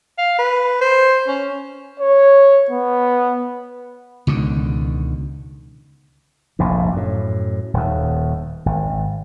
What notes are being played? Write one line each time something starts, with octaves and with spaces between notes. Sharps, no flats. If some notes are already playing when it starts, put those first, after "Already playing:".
F5
B4
C5
C#4
C#5
B3
C#2 B2 D3 D#3
F1 A#1 G#2
F#2 A2
D#1 D#2
G#1